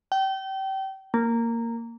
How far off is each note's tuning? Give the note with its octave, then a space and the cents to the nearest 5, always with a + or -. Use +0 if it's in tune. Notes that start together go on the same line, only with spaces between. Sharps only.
G5 -30
A#3 -10